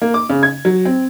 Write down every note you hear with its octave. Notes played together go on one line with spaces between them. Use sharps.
A#3
D6
C#3
G#6
F#3
C4